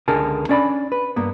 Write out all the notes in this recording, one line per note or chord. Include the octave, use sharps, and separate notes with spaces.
C#2 D3 G#4 A#4 A5
C#4 D4 D5 A5 B5
B4
G2 A#3 B3